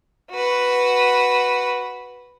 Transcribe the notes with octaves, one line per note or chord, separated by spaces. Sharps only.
F#4 B4